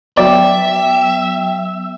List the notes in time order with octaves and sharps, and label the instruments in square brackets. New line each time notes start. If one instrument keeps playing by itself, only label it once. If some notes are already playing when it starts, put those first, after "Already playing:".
[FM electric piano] F#3 B3 [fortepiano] D5 [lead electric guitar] E5 [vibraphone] G5